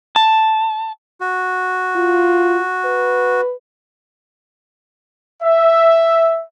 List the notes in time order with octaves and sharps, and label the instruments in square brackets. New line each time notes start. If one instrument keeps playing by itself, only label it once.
[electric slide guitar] A5
[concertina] F#4
[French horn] F4
B4
[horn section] E5